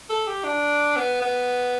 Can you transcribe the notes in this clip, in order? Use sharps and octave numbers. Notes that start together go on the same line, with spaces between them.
A4
G4
D4
B3
B3